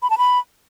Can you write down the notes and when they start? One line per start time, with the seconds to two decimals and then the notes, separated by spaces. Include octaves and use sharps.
0.02 B5
0.10 A5
0.18 B5